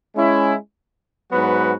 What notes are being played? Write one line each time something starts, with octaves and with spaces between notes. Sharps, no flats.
G#3 C#4 E4
G#2 F#3 B3 F#4 B4